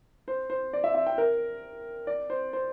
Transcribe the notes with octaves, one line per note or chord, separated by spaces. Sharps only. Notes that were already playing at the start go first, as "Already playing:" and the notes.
C5
C5
D5
E5
E5
G5
A#4
D5
C5
C5